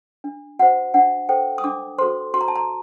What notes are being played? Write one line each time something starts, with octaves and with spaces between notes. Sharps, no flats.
D4
F#4 C5 F#5
D4 F#5
A4 C5 G5
D#6
D4 D6
F#4 A4 C5 C6
F#4 C6
A#5
A5
A#5